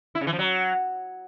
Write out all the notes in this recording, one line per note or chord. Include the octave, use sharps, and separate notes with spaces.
E4
C#3
E3
F3
F#3